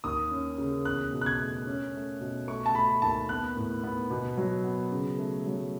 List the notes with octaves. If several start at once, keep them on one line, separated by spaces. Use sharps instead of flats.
D#2 D#6
C#4
C#3
E2 F#6
B2
F#6
G#6
A3
C#4
A3
B2
A3 C#6
A5
A3 B5
D#2 A5
B3 F#6
A2
B3
B2
F#3
B3
C#3
A3
F#3